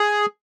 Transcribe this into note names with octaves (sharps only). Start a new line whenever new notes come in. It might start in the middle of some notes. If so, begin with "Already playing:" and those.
Already playing: G#4